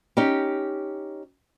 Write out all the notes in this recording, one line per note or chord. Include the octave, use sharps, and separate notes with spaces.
C#4 D#4 G4